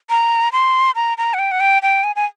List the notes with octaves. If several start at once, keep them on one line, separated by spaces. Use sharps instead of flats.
A#5
C6
A#5
A#5
F#5
G5
F#5
G5
G5
G#5
G#5